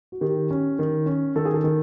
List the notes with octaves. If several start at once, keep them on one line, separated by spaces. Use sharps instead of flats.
F#4
D#3 G4
C#4
D#3
C#4
D#3 A4
G#4
A4
D#3